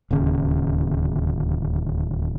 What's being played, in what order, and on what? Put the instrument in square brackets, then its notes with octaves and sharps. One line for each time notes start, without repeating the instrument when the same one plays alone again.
[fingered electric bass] D1 D#2 C#3